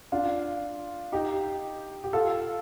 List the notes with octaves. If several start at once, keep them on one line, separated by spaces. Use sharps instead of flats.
D4 F4
D#4 G4
G4
F4 A4